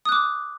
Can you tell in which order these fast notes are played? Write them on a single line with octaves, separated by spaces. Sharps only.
D#6 F#6 D6